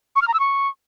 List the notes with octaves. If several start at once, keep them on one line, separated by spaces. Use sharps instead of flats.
C#6
F6
A#5
E6
C#6